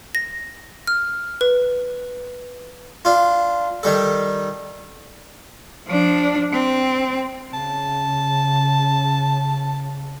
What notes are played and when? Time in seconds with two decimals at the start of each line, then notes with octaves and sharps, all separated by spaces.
0.15 A#6
0.87 F6
1.41 B4
3.05 D4 F4
3.83 D#3 G3 A4
5.88 F3 D4
6.53 C4
7.53 C#3 A5